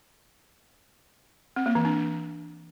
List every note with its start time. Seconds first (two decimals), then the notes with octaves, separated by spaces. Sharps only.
1.56 C4
1.66 A#3
1.75 E3
1.85 D4